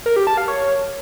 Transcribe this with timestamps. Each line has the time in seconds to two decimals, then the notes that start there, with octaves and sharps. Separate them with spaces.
0.06 A#4
0.16 G4
0.27 A5
0.37 F5
0.48 C#5